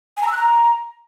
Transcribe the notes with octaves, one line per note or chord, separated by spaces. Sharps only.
G#5
A#5
E6
F#6
A#5